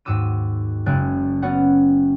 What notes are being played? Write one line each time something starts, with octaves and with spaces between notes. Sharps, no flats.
D#2 G#2 F#4 D6 E6 D#7
F#1 G#3 D5 G#5 F#6 D7
B3 C#4 F#4 C#5 D5 F#5